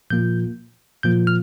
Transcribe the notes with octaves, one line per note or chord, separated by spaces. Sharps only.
A#2 F3 A#3 F4 G6
A#2 F3 A#3 F4 G6
F6